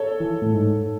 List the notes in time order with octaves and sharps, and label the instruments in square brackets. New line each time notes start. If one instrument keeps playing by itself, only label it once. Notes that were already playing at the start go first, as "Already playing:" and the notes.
Already playing: [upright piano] A4 C#5
[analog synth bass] E3
A2
G#2